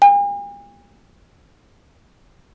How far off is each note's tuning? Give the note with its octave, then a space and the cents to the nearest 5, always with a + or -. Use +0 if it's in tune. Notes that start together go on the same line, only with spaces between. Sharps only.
G#5 -45